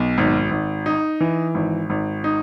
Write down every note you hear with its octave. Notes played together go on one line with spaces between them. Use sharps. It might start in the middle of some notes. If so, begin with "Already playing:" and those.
Already playing: B1
G#1
G#1
D#4
E3
G#1
G#1
D#4